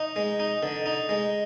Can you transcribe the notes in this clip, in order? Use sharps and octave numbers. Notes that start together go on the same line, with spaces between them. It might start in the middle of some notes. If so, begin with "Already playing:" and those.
Already playing: D#4
G#3
D#4
D3
D#4
G#3